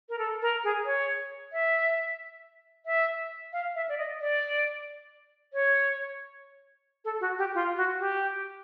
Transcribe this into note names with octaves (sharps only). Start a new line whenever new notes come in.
A#4
A4
A#4
G#4
C#5
E5
E5
F5
E5
D5
D#5
D5
C#5
A4
F#4
G4
F4
F#4
G4